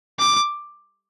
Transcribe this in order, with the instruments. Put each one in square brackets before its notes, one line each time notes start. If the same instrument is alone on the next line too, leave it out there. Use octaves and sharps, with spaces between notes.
[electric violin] D6